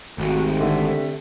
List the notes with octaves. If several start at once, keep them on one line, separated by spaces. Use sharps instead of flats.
G#1 C3 A3 F#4
D3 E5